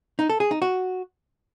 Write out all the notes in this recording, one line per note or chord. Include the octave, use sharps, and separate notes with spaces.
D#4
A4
G#4
D#4
F#4